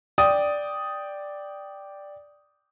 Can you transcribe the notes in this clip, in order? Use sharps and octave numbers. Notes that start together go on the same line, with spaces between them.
D5 G5 D#6